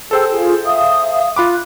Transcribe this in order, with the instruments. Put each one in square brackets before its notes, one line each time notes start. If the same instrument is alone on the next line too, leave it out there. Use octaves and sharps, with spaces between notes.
[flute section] G#4 E6 [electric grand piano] A4 C5 G5
[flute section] F4 G#4
E5 F5 D#6
[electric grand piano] F4 B5 D6 [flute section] F#6